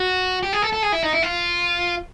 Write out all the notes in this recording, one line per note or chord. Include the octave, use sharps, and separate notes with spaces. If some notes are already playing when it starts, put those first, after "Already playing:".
Already playing: F#4
G4
G#4
A4
A4
G#4
E4
D#4
E4
F4